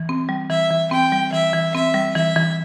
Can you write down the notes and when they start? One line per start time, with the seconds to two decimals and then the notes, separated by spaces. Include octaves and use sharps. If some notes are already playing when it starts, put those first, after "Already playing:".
Already playing: E3
0.09 C4
0.29 G3
0.50 E3 E5
0.71 E3
0.91 C4 G5
1.12 G3
1.33 E3 E5
1.53 E3
1.74 C4 E5
1.94 G3
2.15 E3 E5
2.36 E3